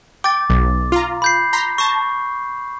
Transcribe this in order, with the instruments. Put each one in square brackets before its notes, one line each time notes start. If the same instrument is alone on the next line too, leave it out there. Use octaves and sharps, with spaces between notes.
[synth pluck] G5 [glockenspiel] D6 A6
[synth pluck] B1
F4 A#5
[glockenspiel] B5 G6 C7
[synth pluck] A#5 C6 B6
[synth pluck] A5 A#6 [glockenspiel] C#6